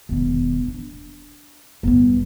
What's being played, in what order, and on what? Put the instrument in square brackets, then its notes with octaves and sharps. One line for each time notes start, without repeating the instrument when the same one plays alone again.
[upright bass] E1 D#3
D4
G1 G2